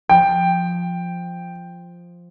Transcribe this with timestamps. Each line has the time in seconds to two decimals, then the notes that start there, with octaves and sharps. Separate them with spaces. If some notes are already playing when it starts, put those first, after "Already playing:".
0.09 F3 G5